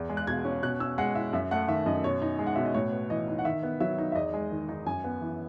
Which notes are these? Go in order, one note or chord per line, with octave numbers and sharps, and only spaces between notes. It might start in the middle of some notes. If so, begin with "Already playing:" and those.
Already playing: E2
G#3
F#6
B2 G#6
C#4
B2 F#6
C#4 E6
G#3 F#5
E4 E5
F#2 E5
A3 F#5
D#3 E5
F#2 D#5
B2 C#5
D#4
G#3
F#5
B2 E5
D#5
A2 C#5
B3
E3 D#5
D#4
F#5
D#3 E5
B3
F#3 E5
D#4
E5
E2 D#5
G#3
D#3
D#4
F#2 G#5
B3
E3